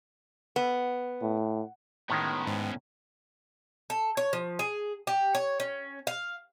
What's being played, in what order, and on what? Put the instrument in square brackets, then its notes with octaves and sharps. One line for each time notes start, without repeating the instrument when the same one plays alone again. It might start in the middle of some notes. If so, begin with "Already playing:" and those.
[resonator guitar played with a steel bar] B3
[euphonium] A2
[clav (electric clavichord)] A2 D#3 G#3 [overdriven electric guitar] B3 C#4
[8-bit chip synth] G#2
[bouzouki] A4
C#5
F3
G#4
G4
C#5
C#4
F5